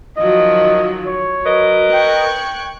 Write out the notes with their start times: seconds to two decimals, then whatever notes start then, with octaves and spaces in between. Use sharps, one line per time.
0.17 D#3 F3 F#3 D#5
1.06 C#5
1.45 F#3 A#4 B4 D#5
1.94 G5 C#6 F#6 G#6